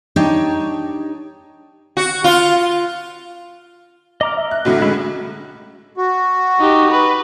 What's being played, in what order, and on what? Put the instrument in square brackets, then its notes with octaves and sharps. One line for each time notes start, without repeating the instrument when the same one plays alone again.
[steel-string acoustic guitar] D4 D#4 G4 C#5 G5
[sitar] F#4
F4
[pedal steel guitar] D#5 A#5 F6 [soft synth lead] D6
[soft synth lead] E5
[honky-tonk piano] F#6
[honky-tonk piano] B1 A2 D3 [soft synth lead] F#4
[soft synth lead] G#3 [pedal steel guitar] C#4 E4
[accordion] F#4
[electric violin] D#4 G4
B4